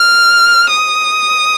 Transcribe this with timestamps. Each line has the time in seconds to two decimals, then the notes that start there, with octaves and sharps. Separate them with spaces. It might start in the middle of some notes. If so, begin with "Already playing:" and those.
Already playing: F6
0.70 D#6